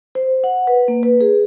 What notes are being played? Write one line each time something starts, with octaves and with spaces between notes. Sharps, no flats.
C5
F#5
B4
A#3
B4
G#4